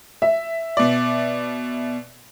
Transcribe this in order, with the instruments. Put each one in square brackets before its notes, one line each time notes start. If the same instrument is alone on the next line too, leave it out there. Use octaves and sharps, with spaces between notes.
[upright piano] E5
[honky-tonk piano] B2 D5